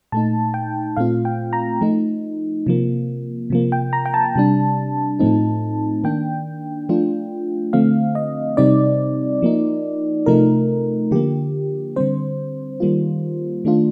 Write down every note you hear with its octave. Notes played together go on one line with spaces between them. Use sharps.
A#2 A3 D#4 A5
G5
A#2 A3 C4 F4 F5
G5
A#5
F3 A3 D#4
C3 F3 A#3
C3 F3 A#3
G5
A#5
G5
A5
C3 G3 D4
A2 F3 A3 C4 D#4
D#3 A#3 D4 G5
F3 A3 D4 F4
D3 F3 A3 C4 F5
D#5
C3 G3 C4 D#4 D5
F3 A#3 D#4
C3 F3 A3 D#4 A#4
D3 F3 A#3 G4
D3 G3 C4 C5
D#3 G3 A#3 F4
D#3 A3 D4 F4